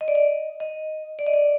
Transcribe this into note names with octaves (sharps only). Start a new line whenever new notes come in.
D#5
D5
D#5
D#5
D5
D#5
D5